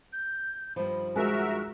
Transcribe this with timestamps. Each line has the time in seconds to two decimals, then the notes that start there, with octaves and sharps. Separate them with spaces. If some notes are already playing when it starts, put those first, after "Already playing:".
0.13 G6
0.76 G2 D#3 F3 B5
1.16 G#3 F#4 A#4 E5 F#6